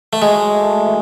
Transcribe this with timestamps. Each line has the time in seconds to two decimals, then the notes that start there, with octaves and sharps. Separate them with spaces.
0.13 A3
0.22 F#3 G#3
0.53 A3
0.86 E3